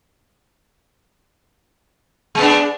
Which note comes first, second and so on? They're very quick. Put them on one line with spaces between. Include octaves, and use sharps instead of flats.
G#3 B3 D4